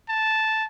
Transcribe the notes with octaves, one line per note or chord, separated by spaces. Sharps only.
A5